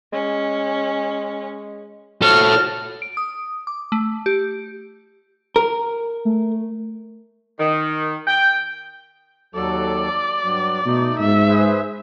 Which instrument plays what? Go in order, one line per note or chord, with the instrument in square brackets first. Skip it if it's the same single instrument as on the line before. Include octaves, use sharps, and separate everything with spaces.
[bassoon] G#3 [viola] C#4
[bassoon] F3 [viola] F#4 A5 [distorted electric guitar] A4 C#5 [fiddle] F6
[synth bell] D7
D#6
D6
A3
G4
[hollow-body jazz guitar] A#4
[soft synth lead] A3
[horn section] D#3
G5
[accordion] D#2 F#3 A4 [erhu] D5
[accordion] G2 F#3
[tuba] B2 [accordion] A3 D#4
[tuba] G#2 [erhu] E5
[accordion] G#4 B4 C5